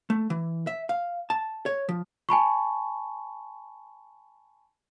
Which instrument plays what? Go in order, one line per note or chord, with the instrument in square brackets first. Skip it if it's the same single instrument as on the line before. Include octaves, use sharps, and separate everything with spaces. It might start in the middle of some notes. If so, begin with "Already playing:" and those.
[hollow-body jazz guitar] A3
E3
E5
F5
A5
C#5
F3
[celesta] G#5 A5 B5 C#6